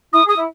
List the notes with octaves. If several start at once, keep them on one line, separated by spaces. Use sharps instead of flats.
E4 D#6
G#4
D#6
E4